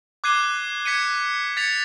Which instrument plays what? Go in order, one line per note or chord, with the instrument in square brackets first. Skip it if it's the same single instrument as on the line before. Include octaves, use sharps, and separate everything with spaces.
[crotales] D6 F#6 G#6 C7 D#7 G7
G#6 B6 C#7 D#7
G#6 A6 B6 C#7 F7